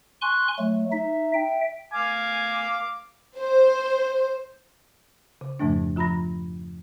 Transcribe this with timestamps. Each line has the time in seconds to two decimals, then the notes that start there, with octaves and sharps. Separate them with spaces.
0.22 G#5 C6 C#6 F#6
0.59 F#3 A3
0.92 D#4 E5
1.34 E5 G5
1.94 F5 G#5 D6
3.37 C5
5.41 C#3
5.60 F2 G#2 C#3 F3 A3 D4
5.96 F3 F4 A#5 B5 A#6